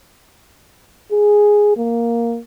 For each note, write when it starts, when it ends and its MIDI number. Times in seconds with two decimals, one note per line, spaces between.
1.12 1.74 68
1.77 2.39 58